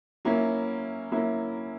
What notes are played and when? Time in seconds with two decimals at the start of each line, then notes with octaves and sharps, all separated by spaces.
0.25 F#3 A#3 C#4 E4
1.12 F#3 A#3 C#4 E4